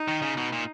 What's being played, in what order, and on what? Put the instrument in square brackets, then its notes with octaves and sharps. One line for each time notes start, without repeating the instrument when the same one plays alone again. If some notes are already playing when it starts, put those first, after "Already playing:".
Already playing: [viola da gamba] D#4
[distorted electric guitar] D#3
C#3
B2
A#2